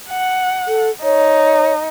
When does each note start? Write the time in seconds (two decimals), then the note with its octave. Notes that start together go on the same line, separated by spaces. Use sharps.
0.10 F#5
0.68 A4
1.03 D#4 C#5